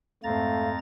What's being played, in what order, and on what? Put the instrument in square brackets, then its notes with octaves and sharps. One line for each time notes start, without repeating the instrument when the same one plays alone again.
[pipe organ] F2 A#5 A6 [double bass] G#2 C4 [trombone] A3 [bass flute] F5